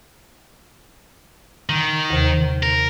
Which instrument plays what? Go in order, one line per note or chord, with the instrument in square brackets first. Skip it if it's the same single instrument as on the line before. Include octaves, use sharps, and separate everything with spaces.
[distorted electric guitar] D#3
[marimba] D#2 C3
[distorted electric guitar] A#4